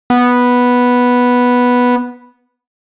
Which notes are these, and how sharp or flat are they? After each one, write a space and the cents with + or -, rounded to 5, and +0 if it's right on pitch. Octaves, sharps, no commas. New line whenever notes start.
B3 -5